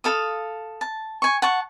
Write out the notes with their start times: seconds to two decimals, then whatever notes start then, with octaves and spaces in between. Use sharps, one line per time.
0.04 A4 F5 D#6
0.81 A5
1.22 G#5 C#6
1.42 F#5 A5 C#6